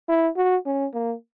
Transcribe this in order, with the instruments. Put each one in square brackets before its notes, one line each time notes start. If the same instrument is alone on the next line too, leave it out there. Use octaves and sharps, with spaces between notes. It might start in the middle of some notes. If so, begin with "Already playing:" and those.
[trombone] E4
F#4
C#4
A#3